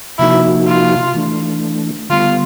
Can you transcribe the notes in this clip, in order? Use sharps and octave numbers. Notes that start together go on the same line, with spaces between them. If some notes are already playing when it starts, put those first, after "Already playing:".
C3 F3 A#3 D#4 E4 F#4
F4
E3 A3 D4
D3 G3 B3 F4